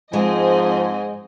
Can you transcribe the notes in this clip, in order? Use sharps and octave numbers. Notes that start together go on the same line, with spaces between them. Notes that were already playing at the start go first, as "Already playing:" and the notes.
G#2 F3 G#3 C4 D#5 G#5